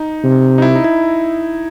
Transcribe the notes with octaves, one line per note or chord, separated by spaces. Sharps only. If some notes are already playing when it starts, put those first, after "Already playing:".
Already playing: D#4
C3
D#4
E4
D#4
E4